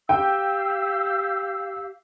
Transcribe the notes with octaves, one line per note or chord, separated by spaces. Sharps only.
G4 F5 G5 E6